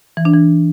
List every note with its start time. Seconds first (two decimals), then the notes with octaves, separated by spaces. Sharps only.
0.17 E3
0.25 D4
0.34 E3